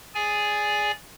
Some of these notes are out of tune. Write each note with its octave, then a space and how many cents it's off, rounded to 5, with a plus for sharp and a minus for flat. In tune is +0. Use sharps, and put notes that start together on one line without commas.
G#4 +0 D5 -15 G#5 +0